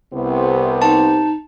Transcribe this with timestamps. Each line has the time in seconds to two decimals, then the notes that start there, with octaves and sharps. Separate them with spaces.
0.13 C2 C3 B3
0.82 D#4 A5